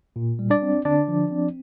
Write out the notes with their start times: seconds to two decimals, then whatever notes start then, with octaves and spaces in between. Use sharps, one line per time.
0.16 A#2
0.39 G3
0.50 D4 D5
0.62 C4
0.85 D3 D4 D5
1.08 F3
1.31 C4